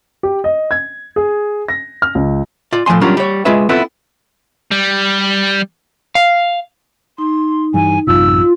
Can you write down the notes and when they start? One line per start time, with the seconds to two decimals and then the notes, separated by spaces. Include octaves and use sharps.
0.23 G4
0.44 D#5
0.71 G#6
1.16 G#4
1.68 A#6
2.02 F6
2.15 C#2
2.73 F4 D5
2.86 A2 F3 B3 G#5 C6
3.01 F#3 G3 C#4 D4 F4 A#4
3.17 G3 C#5
3.45 G#3 F4 G#4 B4 E5
3.69 B3 C4 E4 F4 A4 B4
4.72 G3
6.15 F5
7.18 D#4 C6
7.74 G2 E3 G3 G#5
8.07 A1 F#2 C3 F4 E6